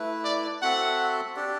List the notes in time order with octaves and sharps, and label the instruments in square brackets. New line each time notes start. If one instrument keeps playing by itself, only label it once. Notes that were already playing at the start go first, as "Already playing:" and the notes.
Already playing: [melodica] A3 E4 B4
[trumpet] D5
[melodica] C4 F#4 A4 E5 [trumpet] F#5
[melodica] D4 G4 D5